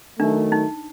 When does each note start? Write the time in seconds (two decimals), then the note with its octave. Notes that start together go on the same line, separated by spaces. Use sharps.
0.19 D#3 F#3 A3 D4
0.52 D#4